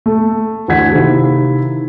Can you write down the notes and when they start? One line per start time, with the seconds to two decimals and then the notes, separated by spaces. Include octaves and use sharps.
0.06 A3
0.68 D2 E3 F#5 G#6 B6
0.92 C3 D#3 A#3 E4